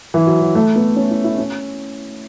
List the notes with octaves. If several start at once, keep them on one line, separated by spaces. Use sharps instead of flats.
E3
F#3
F#3
A3
B3
C#4
E4
E4
C#4